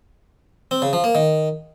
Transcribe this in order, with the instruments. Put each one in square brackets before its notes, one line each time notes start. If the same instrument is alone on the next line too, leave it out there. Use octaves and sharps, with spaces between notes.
[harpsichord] C4
C#3
F3
A#3
D#3